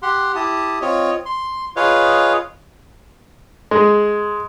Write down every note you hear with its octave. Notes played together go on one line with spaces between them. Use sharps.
G4 F#5 C6
E4 G4 A5 D#6
C4 F4 C#5 D#5
C6
F4 G#4 B4 C#5 D#5 F5
G#3